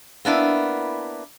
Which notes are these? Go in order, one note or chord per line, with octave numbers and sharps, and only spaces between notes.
A#3 B3 D4 E4